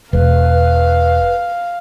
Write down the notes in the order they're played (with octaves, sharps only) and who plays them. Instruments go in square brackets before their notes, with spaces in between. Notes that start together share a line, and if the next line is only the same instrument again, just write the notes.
[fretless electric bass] E1 [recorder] B4 [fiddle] F5